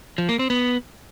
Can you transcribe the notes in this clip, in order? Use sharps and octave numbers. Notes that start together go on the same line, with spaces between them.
F3
A#3
C4
B3